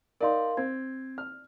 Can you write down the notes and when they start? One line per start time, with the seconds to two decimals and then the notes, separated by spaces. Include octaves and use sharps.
0.21 D#4 A#4 D5 F5 C6
0.57 C4 G#6
1.18 F6